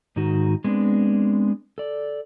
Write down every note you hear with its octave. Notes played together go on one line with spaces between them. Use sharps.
G#2 D#3 D#4 F#4
G#3 B3 C4 D4
A4 D5